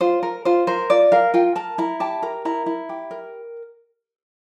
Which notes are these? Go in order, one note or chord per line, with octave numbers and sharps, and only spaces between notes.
F4 C5
A#4
F4 C5
A#4 C5
F4 D5
A#4 F5
F4 G5
A#4 A5
E4 A#5
G4 A5
A#4 A#5
E4 A#5
E4
G4
A#4